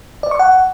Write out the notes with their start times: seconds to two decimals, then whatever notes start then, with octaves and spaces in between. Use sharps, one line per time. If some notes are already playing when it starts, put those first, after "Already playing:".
0.23 D5
0.31 C#6
0.39 F#5